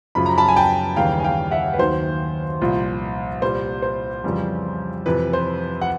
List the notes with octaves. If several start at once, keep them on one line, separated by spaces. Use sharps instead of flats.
F#2 C#3 F3 B5
A#5
A5 B5
G#5
G5 A5
D#2 C#3 E3 G3 F5 G5
G#5
F5 G5
E5 F#5
B4
D#2 D#3 F#3 C5
C2 A#2 F3
C2 A#2 G3 C5
C5
F2 C#3 E3 G3
F2 C3 E3 B4
C5
F#5